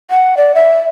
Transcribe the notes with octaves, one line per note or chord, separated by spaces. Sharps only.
F#5
D5
E5